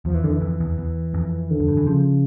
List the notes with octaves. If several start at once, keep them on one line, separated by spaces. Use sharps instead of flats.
E2 F3
E3
F2 D3
E3
F2
E2
E2
F2
D3
F2
G2
E3
C#3 F3